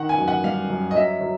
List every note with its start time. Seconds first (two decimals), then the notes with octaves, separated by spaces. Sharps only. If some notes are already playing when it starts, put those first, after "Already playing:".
Already playing: D#3 F#5
0.09 G#5
0.18 F#2
0.28 F#5
0.44 G3 F5
0.70 F#2
0.91 D#5
0.95 F#3 E5
1.21 F#3